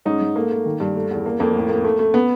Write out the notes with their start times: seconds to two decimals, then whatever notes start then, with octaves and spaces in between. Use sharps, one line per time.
0.05 G#2 C#4 D#4
0.21 G#2
0.36 A3 A#3
0.51 A3
0.66 D#3
0.80 G2
0.95 A3
1.11 E2
1.26 A#3
1.40 F2 A#3
1.55 A2
1.69 A#3
1.84 A3
1.99 A3
2.14 B3